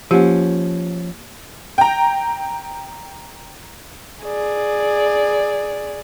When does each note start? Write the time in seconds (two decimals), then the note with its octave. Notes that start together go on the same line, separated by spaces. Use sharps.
0.11 F3 A#3 C#4 G4
1.78 G5 A#5
4.24 G#4 D5